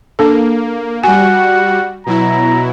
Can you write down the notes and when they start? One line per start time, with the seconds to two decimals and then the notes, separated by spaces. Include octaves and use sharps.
0.19 A#3 D4 A4
1.04 G3 F#4 F#5 G#5
2.06 B2 F#3 E4 A#5